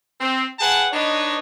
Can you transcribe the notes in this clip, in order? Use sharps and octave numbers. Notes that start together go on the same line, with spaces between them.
C4
G#4 B4 F#5 G5 A5
D4 D#4 B4 C#5 D#5